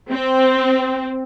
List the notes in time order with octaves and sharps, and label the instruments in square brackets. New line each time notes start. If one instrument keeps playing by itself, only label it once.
[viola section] C4